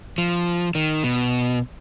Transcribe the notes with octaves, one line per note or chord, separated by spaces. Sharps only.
F3
D#3
B2